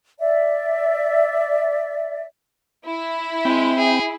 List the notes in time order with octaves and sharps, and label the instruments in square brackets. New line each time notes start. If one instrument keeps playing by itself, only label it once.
[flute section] D5 E5
[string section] E4
[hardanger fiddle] G#3 [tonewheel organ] C4 G5
[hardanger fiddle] G#4